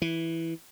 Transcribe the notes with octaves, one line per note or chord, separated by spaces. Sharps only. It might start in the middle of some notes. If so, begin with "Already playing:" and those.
E3